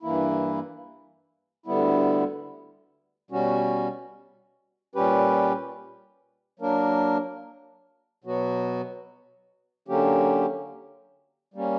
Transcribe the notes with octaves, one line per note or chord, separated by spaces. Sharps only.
G2 E3 A#3 E4
D2 D3 G3 B3 E4
B2 G3 C#4 F#4
A#2 G3 C#4 G4 B4
F#3 A#3 D4 A#4
B2 F#3 B3 F#4
D3 F#3 A#3 C#4 G4
G3 A#3 C#4